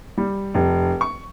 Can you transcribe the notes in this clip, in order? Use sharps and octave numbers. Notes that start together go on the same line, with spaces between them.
G3
F1
C#6